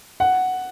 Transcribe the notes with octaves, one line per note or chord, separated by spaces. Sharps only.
F#5